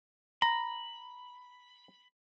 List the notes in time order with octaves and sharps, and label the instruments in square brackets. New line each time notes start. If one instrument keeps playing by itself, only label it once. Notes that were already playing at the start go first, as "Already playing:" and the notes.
[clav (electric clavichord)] A#5 [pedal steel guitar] B5